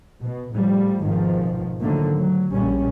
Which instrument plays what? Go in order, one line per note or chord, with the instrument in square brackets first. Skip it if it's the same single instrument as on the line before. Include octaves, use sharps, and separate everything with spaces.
[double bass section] B2
A2 F3 G3
G#1 G#2 B2 D#3 F3
D3 D#3 F3 F#3 A3 A#3
F#3
A#1 G3 C#4